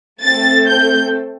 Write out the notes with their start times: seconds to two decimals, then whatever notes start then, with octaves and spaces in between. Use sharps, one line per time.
0.22 A3 C4 A4 A6
0.67 G6